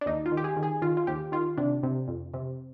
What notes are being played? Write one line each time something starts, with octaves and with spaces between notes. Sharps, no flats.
D4
D#2 D#4
F4
D#3
G4
G#4
D#3
G#4
D#3 F4
F4
D#2 G4
D#3 F4
C3 D4
C3
F2
C3